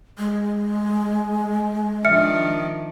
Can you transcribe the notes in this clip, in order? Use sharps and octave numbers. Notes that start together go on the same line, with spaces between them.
G#3
D#3 F3 D4 E5 F6 C#7